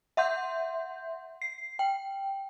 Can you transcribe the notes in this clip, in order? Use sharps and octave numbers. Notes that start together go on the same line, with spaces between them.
E5 F#5 C6 G6
C7
G5